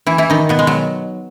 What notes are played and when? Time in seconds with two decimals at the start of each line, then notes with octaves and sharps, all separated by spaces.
0.07 E3 E4
0.18 E3 E4
0.30 D#3 D#4
0.49 B2 B3
0.59 G#3
0.67 F#3